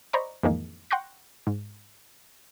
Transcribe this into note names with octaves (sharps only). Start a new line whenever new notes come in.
C5 D5 D#5 A#5 B5 C#6
F2 A2 D#3 E3 G#3 A#3
F#5 G5 C6 C#6 F#6 A#6
G#2